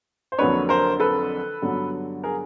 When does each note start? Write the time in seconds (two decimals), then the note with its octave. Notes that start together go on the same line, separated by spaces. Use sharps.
0.32 C5
0.38 F2 D3 F#3 A#3 D4 B4 C#5
0.69 A#4 C5
1.00 A4 B4
1.62 G2 D3 F#3 B3
2.24 G#4 A#4